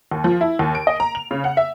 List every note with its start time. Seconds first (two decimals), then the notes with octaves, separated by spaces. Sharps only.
0.11 D#2
0.24 F3
0.41 E4
0.59 D#2
0.75 D7
0.87 D#5
1.00 A#5
1.15 F7
1.31 C#3
1.44 F#5
1.57 E5